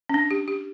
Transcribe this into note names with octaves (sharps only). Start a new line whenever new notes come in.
C#4
D4
G4
G4